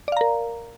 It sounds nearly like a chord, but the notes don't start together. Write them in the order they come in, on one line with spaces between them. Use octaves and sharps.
D5 F5 A#5 A#4